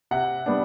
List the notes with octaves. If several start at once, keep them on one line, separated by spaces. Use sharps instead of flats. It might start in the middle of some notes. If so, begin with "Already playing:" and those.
C3 F#5
G3 B3 D4